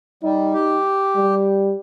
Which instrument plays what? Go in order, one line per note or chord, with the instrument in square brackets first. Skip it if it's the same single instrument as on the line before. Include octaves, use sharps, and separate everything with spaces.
[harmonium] G3 [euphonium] D#4
[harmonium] G4
[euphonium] G3